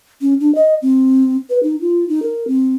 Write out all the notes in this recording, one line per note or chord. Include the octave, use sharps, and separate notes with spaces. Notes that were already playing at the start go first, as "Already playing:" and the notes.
C#4
D4
D#5
C4
B4
D#4
F4
D#4
A#4
C4